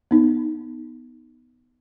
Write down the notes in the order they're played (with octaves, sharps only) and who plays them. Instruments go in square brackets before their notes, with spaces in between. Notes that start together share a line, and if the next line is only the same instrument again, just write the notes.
[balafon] B3 D#4